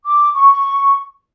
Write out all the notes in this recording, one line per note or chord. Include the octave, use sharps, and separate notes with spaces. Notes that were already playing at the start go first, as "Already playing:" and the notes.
D6
C#6